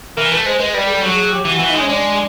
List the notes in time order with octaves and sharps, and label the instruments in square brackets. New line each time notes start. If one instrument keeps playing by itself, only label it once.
[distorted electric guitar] E3 [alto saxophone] A#4
[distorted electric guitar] A3 [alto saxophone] B4
[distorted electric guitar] G#3 [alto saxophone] C5
[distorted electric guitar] G#3 [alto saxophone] B4
[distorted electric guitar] G3 [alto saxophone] B4
[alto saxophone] G#4
A4
[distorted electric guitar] F#3
[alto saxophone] G#4
G4
[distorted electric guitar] E3
[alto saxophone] F#4
[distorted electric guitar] E3
[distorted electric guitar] G#3 [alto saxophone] D#4
[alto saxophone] C#4
[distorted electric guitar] G#3 [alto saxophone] D4